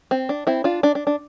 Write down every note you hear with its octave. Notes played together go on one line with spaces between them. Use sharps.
C4
D4
C4 E4
D4 F4
D4
D4
D4